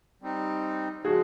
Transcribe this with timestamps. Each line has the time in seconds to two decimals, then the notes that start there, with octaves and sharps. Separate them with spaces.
0.22 G3 C4 D#4
1.05 C#3 F3 G#3 F#4 G#4